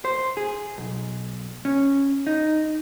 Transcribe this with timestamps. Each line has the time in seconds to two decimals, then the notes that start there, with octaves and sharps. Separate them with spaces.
0.05 C5
0.37 G#4
0.78 B1
1.65 C#4
2.27 D#4